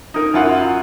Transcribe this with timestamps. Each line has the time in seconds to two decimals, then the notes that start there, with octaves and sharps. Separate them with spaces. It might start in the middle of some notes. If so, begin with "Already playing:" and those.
0.14 D#4 A#4
0.34 F#2 E4 F4 F#5